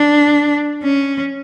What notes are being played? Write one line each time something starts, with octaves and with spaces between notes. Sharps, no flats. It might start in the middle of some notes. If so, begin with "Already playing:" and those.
Already playing: D4
C#4